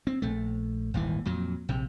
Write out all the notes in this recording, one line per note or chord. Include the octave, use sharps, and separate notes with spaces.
C4
A#1 A3
D#1 G#1 D#2 E3
F2 A#2 F#3
A#1 C3